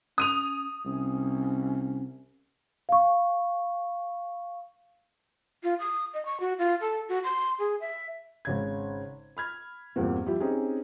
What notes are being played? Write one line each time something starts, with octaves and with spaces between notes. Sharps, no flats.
C#4 D#6 D#7 F7
C2 C#4
F5 C#6
F4
D#6
D#5
C#6
F#4
F4
A4
F#4
C6
G#4
E5
G#1 C#3 G#6
B5 F6 G#6
E2 G2 A#2 A#3 C4
F3 G3 E4 G4
C4 C#4 D#4 G4 G#4